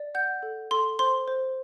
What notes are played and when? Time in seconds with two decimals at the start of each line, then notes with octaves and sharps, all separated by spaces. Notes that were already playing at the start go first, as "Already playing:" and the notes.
Already playing: D5
0.15 F#5 G6
0.43 A4
0.71 A4 C6
0.99 C5 C6
1.28 C5